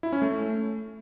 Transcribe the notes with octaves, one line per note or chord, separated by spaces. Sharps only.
E4
C#4
A3